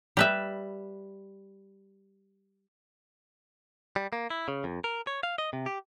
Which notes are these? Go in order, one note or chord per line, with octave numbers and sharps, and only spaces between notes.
G3 B4 E5
G3
A#3
E4
C#3
F2
A#4
C#5
F5
D#5
C3
G4